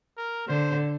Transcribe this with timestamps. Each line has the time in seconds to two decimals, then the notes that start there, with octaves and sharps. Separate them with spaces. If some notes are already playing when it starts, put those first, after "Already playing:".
0.17 A#4
0.48 D3 C5